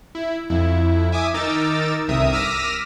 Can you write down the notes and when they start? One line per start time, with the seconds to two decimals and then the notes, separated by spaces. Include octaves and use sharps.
0.15 E4
0.50 F2 E4
1.12 E5 G#5 D6 D#6
1.34 D#3 D#4 A#4 D6 E6 A6
2.08 G1 C2 C3 A#4 E5 D#6
2.33 D6 E6 F6 A#6 B6 D#7